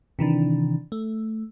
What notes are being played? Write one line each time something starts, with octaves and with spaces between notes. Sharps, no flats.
C3 D#3 E3 D4
A3